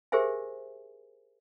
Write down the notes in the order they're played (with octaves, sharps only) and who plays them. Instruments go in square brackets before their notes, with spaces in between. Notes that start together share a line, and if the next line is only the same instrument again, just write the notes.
[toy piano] G4 G#4 A#4 C5 E5 G#5